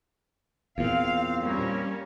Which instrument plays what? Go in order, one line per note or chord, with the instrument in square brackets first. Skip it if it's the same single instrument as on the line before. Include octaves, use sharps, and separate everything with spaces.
[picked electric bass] E2 A#2 [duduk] C4 [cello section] F5
[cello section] G3 A#3 C#4